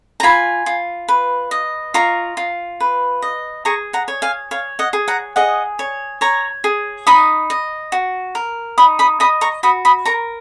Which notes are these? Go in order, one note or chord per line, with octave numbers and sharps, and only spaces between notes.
A#5
F4 G#5 B5
F4
B4
D#5
F4 A#5 C#6
F4
B4
D#5
G#4 A#5 C#6
F#5 A#5
C#5
F5 G#5
C#5 F5
D#5 F#5
G#4
F#5 A#5
G#4 D#5 F#5
C#5
C#5 A#5 C#6
G#4
D#4 B5 D#6
D#5
F#4
A#4
D#4 B5 D#6
B5 D#6
D#5 B5 D#6
A#5 C#6
F#4 B5 D#6
B5 D#6
A#4 A#5 C#6